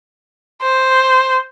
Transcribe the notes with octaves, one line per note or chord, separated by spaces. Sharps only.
C5